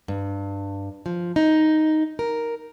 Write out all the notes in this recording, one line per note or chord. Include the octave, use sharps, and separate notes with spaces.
G2
F3
D#4
A#4